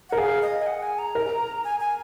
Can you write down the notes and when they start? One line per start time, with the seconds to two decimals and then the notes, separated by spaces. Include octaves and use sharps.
0.09 F#5
0.12 A#4
0.18 G#4 F5
0.42 D#5
0.62 G#5
0.66 F#5
0.82 G#5
0.99 A#5
1.15 A#4
1.64 G#5
1.80 G#5